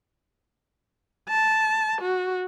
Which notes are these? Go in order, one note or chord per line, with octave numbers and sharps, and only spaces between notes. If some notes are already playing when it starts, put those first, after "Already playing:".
A5
F#4